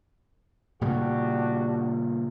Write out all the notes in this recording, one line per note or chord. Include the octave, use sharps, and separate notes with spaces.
A#2 C#3 G3 D4 F#4 G4